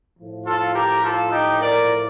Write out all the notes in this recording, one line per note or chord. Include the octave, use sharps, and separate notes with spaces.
A2 F3
F4 A4
G4 A#4
F4 A4
D#4 G4
A#4 D5